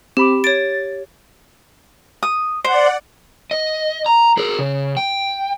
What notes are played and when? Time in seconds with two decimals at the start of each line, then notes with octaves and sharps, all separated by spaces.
0.17 C4 G4 B5 D6
0.44 C#5 A6 D7
2.23 D#6
2.64 C5 D5 F#5
3.51 D#5
4.06 A#5
4.37 G#4 A#4
4.59 C#3
4.97 G5